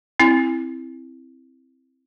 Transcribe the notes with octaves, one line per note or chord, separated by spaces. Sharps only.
C4 E4